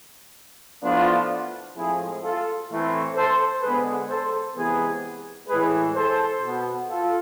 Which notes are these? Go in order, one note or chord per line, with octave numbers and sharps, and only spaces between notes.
A2 F3 B3 D4 F4
A2 F3 G#3 C4 E4 G#4
F4 A4
A2 E3 A3 C4
A4 C5
D3 G#3 B3 G#4 B4
A4 C5
C3 E3 G#3 B3 G#4 B4
A2 E3 G#3 G#4 B4
A4 C5
B2 B3
F4 A4